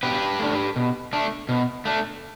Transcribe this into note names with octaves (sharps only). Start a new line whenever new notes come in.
B2 G4 B4
A3 D4
B2
A3 D4
B2
A3 D4